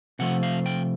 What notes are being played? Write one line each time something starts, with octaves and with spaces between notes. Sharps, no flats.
C3 F3 A3 F#5
F5
G5